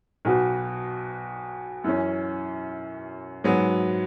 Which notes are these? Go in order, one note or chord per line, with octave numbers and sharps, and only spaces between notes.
B1 B2 B3 F#4
F#2 E3 C#4
G#2 F#3 B3